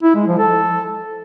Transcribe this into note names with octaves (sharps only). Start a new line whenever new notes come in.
E4
G#3
F3
A4